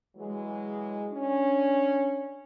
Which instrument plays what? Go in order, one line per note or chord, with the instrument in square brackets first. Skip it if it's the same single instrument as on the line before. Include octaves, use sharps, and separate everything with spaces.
[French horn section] E3 F#3 G#3
C#4 D4